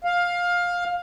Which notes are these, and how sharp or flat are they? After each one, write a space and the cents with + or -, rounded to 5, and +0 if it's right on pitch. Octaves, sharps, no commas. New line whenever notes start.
F5 +15